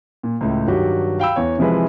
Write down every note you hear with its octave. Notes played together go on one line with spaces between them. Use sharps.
A#2
C#2 A2
G2 D#3 F#3 F#4 G4
F5 G5 B5 E6
E2 E3 C#5
C3 E3 F3 G#3 E4 B4